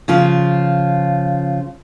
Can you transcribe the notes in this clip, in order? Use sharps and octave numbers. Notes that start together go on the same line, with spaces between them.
C#3 F3 F4